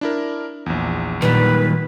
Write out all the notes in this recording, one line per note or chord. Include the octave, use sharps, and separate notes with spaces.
D4 E4 A#4
A#1 E2
A#2 D#3 F#3 G3 B4